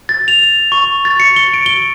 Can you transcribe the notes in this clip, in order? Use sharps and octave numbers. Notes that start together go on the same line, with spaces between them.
A6
F7
C#6
A6
C#7
G7
D7
G7